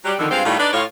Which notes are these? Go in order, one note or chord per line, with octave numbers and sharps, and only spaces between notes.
F#3 G3 G4
F2 D3 D#3
G2 G#3 C4 F4 F5
A2 D#3 G3 A3 D#4 F4
D4 D#4 B4 D5
A2 F4 C#5